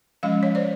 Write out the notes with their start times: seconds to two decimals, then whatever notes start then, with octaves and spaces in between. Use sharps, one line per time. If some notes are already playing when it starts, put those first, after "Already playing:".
0.23 F3 G#3 C#4 D#5 F5
0.43 C#5
0.55 C5 D5